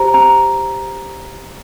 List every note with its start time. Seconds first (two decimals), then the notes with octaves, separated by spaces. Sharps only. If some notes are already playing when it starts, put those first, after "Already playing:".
Already playing: G4 C5 A#5
0.14 A#5